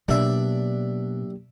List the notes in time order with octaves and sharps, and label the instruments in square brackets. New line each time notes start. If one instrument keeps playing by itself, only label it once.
[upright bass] B2 [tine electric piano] F#3 A#3 G4 [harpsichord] D4 E5